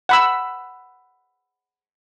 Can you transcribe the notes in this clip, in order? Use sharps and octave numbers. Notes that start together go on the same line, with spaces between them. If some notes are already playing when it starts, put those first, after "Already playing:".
F#5 B5 E6